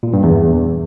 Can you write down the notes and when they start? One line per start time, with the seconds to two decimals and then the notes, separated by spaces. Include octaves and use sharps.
0.03 A#2
0.13 G2
0.23 E2